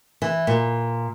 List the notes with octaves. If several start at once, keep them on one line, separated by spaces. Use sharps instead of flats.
E3
A#2